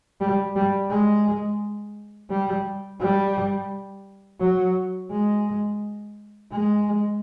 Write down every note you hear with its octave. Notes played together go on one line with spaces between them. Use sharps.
G3
G3
G#3
G3
G3
F#3
G#3
G#3